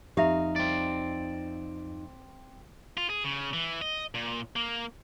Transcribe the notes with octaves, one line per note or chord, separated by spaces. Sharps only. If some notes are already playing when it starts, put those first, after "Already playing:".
F2 D#4 G4 E5 F5
C4 D5
F4
G#4
C#3
E3
D#5
A#2
A#3